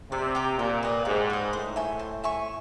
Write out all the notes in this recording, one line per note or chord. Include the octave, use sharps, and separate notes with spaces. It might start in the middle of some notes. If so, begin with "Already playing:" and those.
C3 D5
G5 A#5 D6
A#2 G4
B4 D#5
G#2 G4
B4 D#5
A2 C5
E5 G#5 C#6
C5
E5 G#5 C#6